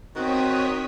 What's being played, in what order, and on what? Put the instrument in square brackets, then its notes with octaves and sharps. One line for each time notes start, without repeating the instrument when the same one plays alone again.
[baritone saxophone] D#3 [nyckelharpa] C4 [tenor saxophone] F#4 [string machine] C#5 D#6 B6